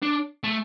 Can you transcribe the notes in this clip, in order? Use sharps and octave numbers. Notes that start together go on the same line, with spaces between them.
D4
A3